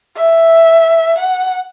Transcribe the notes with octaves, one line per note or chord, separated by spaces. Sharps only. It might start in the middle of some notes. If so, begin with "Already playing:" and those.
E5
F#5